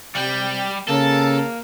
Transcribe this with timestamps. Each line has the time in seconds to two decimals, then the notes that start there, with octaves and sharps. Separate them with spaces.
0.15 C3 G3 G5
0.88 C#3 A#3 A4 A5